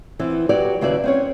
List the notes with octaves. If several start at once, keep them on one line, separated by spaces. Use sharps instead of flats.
E3 B3 C4 E4
F#3 G4 B4 D5
D#2 C#3 E4 F#4 B4 D5
C4 C#4 C#5